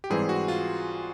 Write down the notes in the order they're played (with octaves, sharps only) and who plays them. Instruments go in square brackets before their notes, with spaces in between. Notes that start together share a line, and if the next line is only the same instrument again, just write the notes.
[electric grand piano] G4
[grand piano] G#2 E3 G3 C4 [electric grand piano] G#4
[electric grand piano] F#4
F4